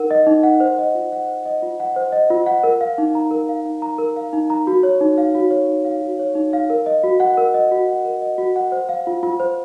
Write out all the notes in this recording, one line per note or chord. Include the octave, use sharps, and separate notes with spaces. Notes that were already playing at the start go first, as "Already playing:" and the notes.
Already playing: D#4 A#4 F#5
D#5
D#4
F#5
C5
D#5
F4
F#5
C5
D#5
F4
F#5
C5
D#5
F4
F#5
A#4
F5
D#4
A#5
A#4
F5
D#4
A#5
A#4
F5
D#4
A#5
F#4
C#5
D#4
F5
F#4
C#5
D#4
F5
F#4
C#5
D#4
F5
A#4
D#5
F#4
F#5
A#4
D#5
F#4
F#5
A#4
D#5
F#4
F#5
C5
F5
F4
F4
C5